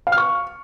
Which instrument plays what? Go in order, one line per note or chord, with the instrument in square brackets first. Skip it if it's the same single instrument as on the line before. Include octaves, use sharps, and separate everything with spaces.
[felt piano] F5
F6
C#6